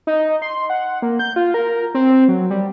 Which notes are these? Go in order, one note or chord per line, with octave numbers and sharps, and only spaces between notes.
D#4
C6
F#5
A#3
G6
F4
A#4
C4
F#3
G3